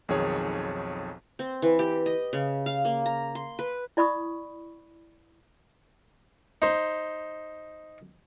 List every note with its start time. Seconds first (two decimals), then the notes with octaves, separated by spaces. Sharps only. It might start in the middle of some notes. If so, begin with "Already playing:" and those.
0.09 B1 F2 D#3 G#4 C#5
1.39 C4
1.62 E3
1.79 G4
2.06 D#5
2.33 C#3
2.66 F5
2.85 A#3
3.06 A#5
3.35 C6
3.59 B4
3.97 E4 D5 B5 C#6 D#6
6.62 D#4 C5